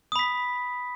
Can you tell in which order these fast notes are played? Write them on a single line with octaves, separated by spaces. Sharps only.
D#6 B5 B6